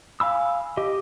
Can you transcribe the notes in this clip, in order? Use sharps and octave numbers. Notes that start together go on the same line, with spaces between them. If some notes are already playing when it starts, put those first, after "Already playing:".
F5 G#5 B5 E6
G4 D#5